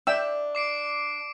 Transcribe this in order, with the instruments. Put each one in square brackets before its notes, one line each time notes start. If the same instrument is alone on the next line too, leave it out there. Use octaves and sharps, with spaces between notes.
[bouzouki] D4 [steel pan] E5 G5 E6
[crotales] D6 C7 D7